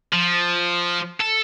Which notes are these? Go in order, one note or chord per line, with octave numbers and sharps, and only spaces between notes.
F3
A4